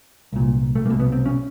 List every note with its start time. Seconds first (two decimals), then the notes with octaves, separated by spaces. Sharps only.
0.33 C2 A#2
0.75 A3
0.85 C2 A#3
0.90 B2
1.00 B3
1.12 C4
1.26 C#4